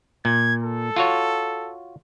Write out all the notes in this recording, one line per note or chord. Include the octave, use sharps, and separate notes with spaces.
A#2 G#6
A4
F4 F#4 C#5